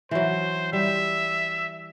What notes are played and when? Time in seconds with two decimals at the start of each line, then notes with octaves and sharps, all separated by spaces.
0.11 E3 F#3 C5
0.73 G3 E5